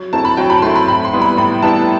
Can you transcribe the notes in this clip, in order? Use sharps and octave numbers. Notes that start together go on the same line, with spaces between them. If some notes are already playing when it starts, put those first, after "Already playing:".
Already playing: F#3
A3 C4 E4 A5
B5
F#3 G5
B5
A3 C4 E4 C6
B5
A2 B5
C6
G3 B3 E4
B5
A2 B5
G3 B3 E4 A5